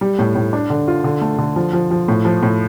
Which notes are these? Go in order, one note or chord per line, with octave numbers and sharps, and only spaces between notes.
G3
A2
A2
D4
D3
F4
D3
A3
D3
F3
F3
F3
A2
F3
A2